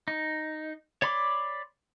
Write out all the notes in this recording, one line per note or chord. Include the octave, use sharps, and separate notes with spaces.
D#4
C#5 D5 B5 C6 D6